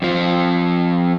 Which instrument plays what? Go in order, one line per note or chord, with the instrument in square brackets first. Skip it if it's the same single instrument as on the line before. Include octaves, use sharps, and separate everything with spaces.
[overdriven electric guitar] F2 F3